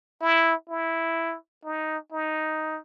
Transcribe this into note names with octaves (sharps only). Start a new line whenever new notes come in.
E4
E4
D#4
D#4